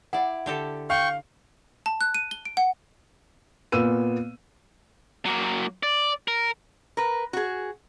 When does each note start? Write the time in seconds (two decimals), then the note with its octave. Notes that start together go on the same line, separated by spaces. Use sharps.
0.13 E4 D5 F#5
0.46 D3 G4 A4
0.90 F5 G5 C#6
1.86 A5
2.01 F#6
2.14 D#7
2.31 G7
2.45 D7
2.57 F#5
3.72 A#2 B3 E6 D#7
5.25 F#3 A#3
5.83 D5
6.28 A#4
6.97 A#4 B4
7.33 F#4 G#4